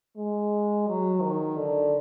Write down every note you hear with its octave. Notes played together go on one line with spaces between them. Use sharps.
G#3
F#3
D#3
D3